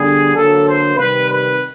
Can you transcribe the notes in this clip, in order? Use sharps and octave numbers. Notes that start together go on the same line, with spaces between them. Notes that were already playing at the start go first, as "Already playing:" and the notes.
Already playing: D3 G3 B3 G#4
D3 F#3 A#3 A4
C5
C3 D#3 G3 B4
B4